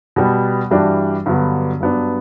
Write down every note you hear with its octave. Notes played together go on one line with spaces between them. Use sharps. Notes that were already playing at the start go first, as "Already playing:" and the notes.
B2 G3 B3
G2 E3 G3 D4 F#4
G2 D3 F#3 B3 F#4
G2 F#3 B3 D4